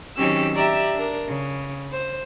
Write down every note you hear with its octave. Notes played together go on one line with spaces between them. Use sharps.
D#3 F#3 C4 C#4 G4 E6
G4 D5 E5 A#5 E6
D4 A#4
C#3
C5